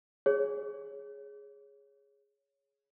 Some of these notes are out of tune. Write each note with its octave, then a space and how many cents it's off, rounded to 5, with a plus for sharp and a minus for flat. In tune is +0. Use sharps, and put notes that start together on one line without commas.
G#4 +0 C#5 +0